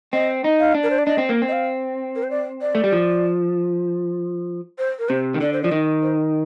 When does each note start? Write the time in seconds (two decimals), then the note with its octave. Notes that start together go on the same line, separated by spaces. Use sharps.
0.13 C4 D#5
0.44 D#4
0.60 F5
0.75 D4
0.83 A#4
0.90 C5
0.98 D5
1.06 D4 D#5
1.18 C4
1.29 A#3
1.42 C4
1.48 D#5
1.52 F5
2.16 A#4
2.23 C5
2.31 D5
2.61 D5
2.75 A3
2.84 G3
2.92 F3
4.78 C5
4.99 A#4
5.09 C3 C5
5.34 D#3
5.41 D3 D5
5.53 C5
5.62 F3 D5
5.71 D#3 D#5
6.02 C5